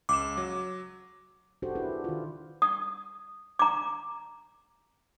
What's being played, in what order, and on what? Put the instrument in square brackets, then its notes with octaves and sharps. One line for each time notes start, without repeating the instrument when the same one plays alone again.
[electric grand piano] C#2 E7 [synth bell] D6
[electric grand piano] F#3
[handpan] D4 F#4 G4 A4 C5
D4 E4 G4 G#4 B4
D#3 F4
[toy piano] D#6
A#5 D6